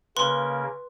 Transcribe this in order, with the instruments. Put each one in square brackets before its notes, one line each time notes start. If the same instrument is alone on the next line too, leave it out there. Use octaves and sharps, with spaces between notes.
[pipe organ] C#3 A#3 [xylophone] B4 C6